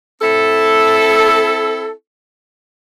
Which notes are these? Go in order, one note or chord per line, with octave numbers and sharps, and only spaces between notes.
C4 E4 A4